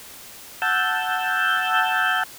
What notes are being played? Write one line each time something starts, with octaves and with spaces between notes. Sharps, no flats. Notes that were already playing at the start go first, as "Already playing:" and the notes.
F#5 A5 E6 G6